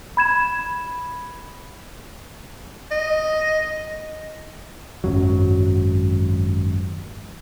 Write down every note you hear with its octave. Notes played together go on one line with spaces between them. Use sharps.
B5 G#6 E7
D#5
G#1 F#2 F#3